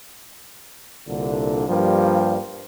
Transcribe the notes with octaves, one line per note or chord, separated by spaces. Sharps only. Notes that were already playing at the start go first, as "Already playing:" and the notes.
C2 A#2 D3
G2 F3 G3 A#3